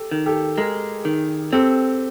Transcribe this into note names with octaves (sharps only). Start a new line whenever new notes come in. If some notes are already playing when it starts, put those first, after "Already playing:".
Already playing: G4 A4
D#3
G4 A4
G#3 G#4 A#4
D#3
C4 G4 A4